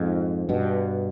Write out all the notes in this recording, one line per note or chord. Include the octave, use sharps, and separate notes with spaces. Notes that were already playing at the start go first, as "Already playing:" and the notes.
Already playing: F2 G#2
G2 B2